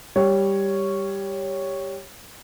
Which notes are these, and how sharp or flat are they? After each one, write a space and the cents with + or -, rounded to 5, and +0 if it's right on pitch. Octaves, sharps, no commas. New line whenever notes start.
G3 +5 C#5 +0